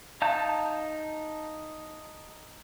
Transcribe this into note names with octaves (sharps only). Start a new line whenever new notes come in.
D#4 F5 A5 A#5 G6